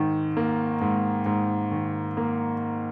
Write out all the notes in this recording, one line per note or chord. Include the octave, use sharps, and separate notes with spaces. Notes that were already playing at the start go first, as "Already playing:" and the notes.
Already playing: G#2 D#3
A#3
G#2
G#2
D#3
A#3